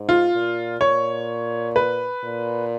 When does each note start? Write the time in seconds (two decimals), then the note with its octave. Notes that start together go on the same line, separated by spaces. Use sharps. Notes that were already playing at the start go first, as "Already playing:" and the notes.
Already playing: G#2
0.09 F4
0.33 A#2
0.81 A#2 C#5
1.76 B4
2.24 A#2